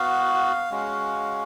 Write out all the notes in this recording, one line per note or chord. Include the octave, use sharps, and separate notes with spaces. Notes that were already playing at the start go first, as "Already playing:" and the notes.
Already playing: B3 F#4 F5
G#3 C#4 F#4